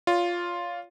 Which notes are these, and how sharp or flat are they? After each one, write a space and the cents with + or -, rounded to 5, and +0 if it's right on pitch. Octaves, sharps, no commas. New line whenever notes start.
F4 +0 C#5 +45